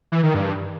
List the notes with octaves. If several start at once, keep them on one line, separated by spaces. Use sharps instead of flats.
E3
D#3
G2